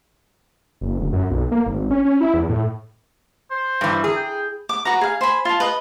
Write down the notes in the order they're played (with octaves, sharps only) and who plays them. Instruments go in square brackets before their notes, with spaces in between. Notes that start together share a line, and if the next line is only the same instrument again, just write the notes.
[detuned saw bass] F#1
D1
F#2
B1
A#3
G#1
C#4
C#4
E4
E2
A2
[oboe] C5
[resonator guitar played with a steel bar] G2 E3
G#4
[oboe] G5
[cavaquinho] D6
F#4 B4 A#5
G#4 F5
C5 G#5 B5
F4 A5
B4 D#5